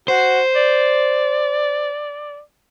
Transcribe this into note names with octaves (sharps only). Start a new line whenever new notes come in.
F#4 C5
D5